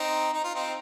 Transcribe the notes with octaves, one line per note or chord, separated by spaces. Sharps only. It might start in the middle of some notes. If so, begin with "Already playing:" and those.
Already playing: C4 D#4
D#4
F4
C4 D#4